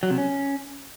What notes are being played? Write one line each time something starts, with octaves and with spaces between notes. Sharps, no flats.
F#3
C3
C#4